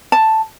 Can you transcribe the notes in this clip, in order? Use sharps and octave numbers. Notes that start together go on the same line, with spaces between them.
A5